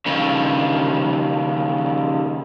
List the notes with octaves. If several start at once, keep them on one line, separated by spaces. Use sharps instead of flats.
D#2 C#3